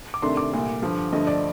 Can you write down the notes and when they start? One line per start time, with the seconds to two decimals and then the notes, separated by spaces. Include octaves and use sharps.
0.14 D6
0.22 C3 D#3 A3 D4 C6
0.37 D6
0.53 C2 A#2 A3
0.82 G2 D3 F3
1.12 G2 D3 F3 A3 D#5
1.27 D5